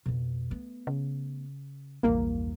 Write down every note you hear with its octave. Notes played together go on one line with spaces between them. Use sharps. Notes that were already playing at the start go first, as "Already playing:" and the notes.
F2 B2
A3 B3
C#3
A#1 E2 G2 A#3